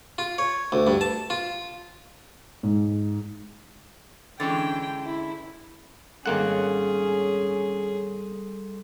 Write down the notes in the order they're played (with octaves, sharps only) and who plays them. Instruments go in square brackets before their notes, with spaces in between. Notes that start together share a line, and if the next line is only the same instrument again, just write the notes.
[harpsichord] F4
C#5
D2
G2
A5
F4
[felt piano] G#2
[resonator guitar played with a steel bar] D3 E3 G#3 [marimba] C#4 A6 [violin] G5
[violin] E4
[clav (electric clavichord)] G#1 A#3 F#5 [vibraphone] G3 A4 C6 [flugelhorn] C#4 [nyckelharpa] G#4